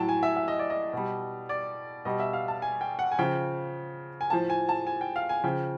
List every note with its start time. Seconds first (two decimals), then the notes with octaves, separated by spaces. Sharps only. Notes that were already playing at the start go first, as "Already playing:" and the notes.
Already playing: A2 F#3 G5 A5
0.09 G#5
0.23 E5
0.36 E5
0.48 D#5
0.59 D5
0.70 D#5
0.93 B2 G3
1.49 D5
2.05 B2 G3 D#5
2.20 E5
2.33 F5
2.48 A5
2.62 G#5
2.81 G5
2.99 F#5
3.11 G#5
3.19 C#3 F3 G5
4.21 G#5
4.30 A2 F3 A5
4.50 G#5
4.69 A5
4.87 G#5
5.01 G5
5.16 F5
5.29 G#5
5.44 C#3 F3 G5